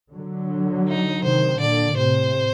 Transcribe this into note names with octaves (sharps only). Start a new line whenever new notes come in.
D3 F#3
D#4
C3 D#3 C5
A#2 D3 D5
A2 C3 C5